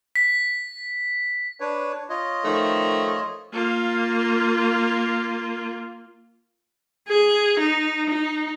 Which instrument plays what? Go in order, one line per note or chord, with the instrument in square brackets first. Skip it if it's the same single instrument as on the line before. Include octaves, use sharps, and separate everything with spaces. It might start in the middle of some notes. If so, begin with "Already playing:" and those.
[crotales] B6
[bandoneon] D4 B4 C#5
F4 C#5 D#5
[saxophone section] D#3 F3 A3
[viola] A#3 F4
G#4
D#4
D#4